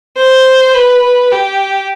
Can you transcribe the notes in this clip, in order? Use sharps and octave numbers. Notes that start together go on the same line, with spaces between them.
C5
B4
B4
G4